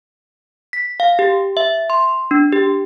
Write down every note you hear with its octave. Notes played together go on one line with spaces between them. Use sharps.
B6
F5
G4
E5
C6
D4
G4